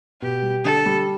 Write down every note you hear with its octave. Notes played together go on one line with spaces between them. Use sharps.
B2 G4
G3
D3 A4
G3